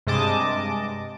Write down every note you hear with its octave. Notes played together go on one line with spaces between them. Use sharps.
G2 C3 G#3 D#5 A5 D6